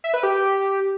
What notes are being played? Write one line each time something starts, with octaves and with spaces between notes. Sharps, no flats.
E5
B4
G4